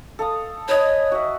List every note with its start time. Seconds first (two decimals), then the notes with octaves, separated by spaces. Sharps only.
0.19 A4 F5 D#6
0.69 B4 C#5 D#5 G#5
1.12 F#4 E5